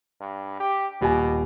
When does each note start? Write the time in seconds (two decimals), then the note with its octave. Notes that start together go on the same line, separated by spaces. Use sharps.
0.21 G2
0.60 G4
1.01 D#1 B2 G4 G#5